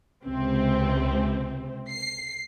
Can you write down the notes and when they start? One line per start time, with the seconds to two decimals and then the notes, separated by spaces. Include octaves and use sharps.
0.25 C#2 C3 C4
1.89 C7